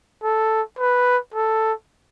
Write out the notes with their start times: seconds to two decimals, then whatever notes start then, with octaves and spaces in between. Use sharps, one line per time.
0.23 A4
0.79 B4
1.34 A4